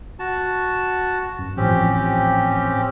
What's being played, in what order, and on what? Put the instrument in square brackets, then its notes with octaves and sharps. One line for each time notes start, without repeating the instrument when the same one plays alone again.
[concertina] F#4 A5
[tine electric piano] F#2
[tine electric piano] A1 A2 F3 [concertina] C4 C#4 G4